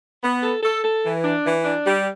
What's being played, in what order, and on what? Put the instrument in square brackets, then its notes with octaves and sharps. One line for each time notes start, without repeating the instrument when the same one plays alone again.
[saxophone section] B3
A4
A4
A4
E3
D4
E3
D4
G3